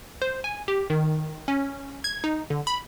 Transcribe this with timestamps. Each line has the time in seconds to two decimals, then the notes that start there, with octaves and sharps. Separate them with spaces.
0.22 C5
0.44 G#5
0.68 G4
0.90 D#3
1.48 C#4
2.04 G#6
2.24 D#4
2.50 D3
2.67 B5